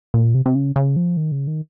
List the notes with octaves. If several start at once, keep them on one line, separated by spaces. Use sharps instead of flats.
A#2
C3
C3
C#3
C#3
F3
D#3
C#3
D#3